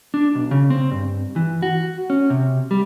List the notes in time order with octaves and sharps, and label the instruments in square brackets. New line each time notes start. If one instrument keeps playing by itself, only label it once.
[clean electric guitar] D4
B1
C#3
C4
G2
E3
F#4
C#4
C3
G3